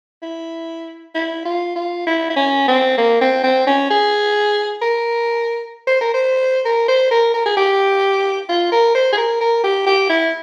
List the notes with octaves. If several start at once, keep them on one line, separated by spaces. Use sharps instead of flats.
E4
E4
F4
F4
E4
E4
C#4
C4
A#3
C4
C4
C#4
G#4
A#4
C5
A#4
C5
A#4
C5
A#4
A#4
G#4
G4
F4
A#4
C5
G#4
A#4
A#4
G4
G4
E4